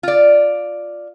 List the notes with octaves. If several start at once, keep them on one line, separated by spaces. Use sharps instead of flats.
F4 D5